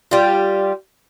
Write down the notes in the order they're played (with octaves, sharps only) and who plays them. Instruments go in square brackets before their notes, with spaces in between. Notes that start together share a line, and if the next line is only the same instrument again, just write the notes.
[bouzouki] G3 F4